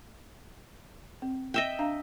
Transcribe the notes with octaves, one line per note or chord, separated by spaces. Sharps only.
C4
D#5 E5 G5
D4 F5 A#5